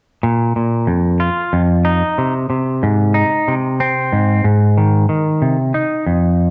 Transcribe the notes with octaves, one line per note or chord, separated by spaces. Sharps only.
A#2
A#2
F2
F4
F2
D#4
C3
C3
G#2
D#4
C3
C4
G#2
G#2
D#3
D#3
C3
D#4
F2